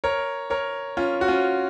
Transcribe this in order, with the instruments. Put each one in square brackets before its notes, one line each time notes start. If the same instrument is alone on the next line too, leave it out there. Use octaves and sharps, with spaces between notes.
[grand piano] A#4 C#5
A#4 C#5
C#4 F4
F#4
C#4 F4